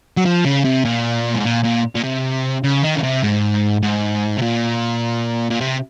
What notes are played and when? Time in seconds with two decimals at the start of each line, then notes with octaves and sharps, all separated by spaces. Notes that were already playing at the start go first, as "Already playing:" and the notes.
0.17 F#3
0.26 F3
0.45 C#3
0.65 C3
0.85 A#2
1.34 G#2
1.44 A#2
1.63 A#2
1.95 A#2
2.03 C3
2.63 C#3
2.83 D#3
2.95 C#3
3.03 C3
3.23 G#2
3.82 G#2
4.37 C3
4.42 A#2
5.51 A#2
5.61 C3